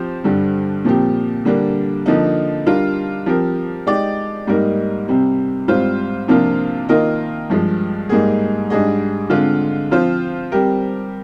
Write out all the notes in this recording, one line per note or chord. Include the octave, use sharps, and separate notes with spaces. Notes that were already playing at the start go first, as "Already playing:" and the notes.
Already playing: F3 C4 G4 C5
G2 D3 G3
A#2 F3 C4 G4
D3 G3 A#3 D4
D3 F3 A#3 D#4
G3 D4 F4 A#4
F3 C4 G4 A#4
G#3 D#4 G4 D5
G#2 G3 A#3 D#4 A#4
C3 G3 C4
G#2 G3 C4 F4 C5
C3 F3 A#3 D4 F4
D#3 A#3 F4 A#4 D#5
G2 F3 G#3
G#2 G3 A#3 D#4 G#4
G#2 G3 D4 G#4 D#5
D3 G#3 C4 F4
F3 C4 F4 C5
G3 C4 G4 A#4